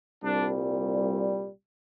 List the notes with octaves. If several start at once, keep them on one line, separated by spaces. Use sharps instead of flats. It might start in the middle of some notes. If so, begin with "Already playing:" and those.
C2 A#2 G3 D4